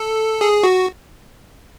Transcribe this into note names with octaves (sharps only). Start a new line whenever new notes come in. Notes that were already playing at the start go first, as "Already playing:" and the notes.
Already playing: A4
G#4
F#4